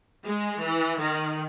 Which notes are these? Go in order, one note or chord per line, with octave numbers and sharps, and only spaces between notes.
G#3
E3
D#3